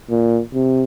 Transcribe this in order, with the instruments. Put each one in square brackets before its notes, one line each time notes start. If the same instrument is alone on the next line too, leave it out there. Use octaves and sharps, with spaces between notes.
[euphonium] A#2
C3